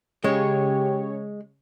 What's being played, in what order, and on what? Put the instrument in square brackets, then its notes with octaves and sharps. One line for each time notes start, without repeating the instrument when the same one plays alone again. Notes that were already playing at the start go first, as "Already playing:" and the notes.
[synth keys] C#3 C#5 [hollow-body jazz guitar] G#3 [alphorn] G4